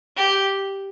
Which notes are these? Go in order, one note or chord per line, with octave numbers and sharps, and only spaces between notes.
G4